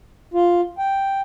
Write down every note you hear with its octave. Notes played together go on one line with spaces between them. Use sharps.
F4
G5